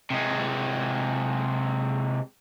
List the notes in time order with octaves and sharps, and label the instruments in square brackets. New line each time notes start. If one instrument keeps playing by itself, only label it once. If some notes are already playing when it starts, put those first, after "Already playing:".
[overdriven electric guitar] C3 G#3